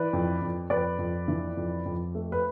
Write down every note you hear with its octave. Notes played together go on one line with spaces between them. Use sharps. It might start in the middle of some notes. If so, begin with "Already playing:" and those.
Already playing: E3 B4 D5
F2
F2
F2 B4 D5
F2
E3
F2
F2
A3
B4